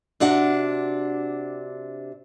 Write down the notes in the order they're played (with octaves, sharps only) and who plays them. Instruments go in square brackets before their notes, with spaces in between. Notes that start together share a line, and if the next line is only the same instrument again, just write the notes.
[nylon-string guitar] C3 D4 F#4 F#5